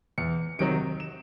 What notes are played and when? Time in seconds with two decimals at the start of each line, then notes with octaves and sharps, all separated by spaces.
0.18 E2 C#7
0.59 C3 D#3 F#3 D7
1.00 E7